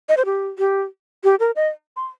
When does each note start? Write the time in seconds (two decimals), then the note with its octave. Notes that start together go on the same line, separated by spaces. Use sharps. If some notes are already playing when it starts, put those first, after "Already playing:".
0.09 D#5
0.17 C5
0.25 G4
0.59 G4
1.24 G4
1.40 A#4
1.56 D#5
1.96 C6